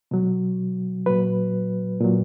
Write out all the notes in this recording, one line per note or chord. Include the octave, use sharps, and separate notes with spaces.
B2 F#3
A#2 F#3 B4
A#2 F#3